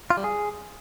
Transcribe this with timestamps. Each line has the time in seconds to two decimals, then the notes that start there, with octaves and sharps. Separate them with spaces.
0.10 F4
0.17 G3
0.24 G#4